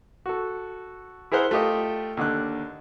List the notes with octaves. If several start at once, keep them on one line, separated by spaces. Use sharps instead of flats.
F#4 A4
E4 G#4 A#4 C5 F#5
A3 F4 G4 D#5
D#2 D3 F#6